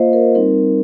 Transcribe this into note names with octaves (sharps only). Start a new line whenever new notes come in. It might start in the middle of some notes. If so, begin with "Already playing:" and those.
Already playing: A#3 F4 C5 D#5 F5
A#4
G3 C4 D#4 A#4